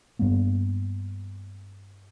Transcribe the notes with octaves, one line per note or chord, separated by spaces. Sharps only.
G2 G3 A#3 B3